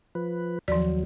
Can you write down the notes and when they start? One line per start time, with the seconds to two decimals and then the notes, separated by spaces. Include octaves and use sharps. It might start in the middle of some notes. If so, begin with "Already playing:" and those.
0.15 F3 B4
0.68 D#2 F3 F#3 D5